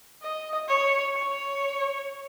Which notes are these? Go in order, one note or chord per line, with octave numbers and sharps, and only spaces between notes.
D#5
C#5
C#5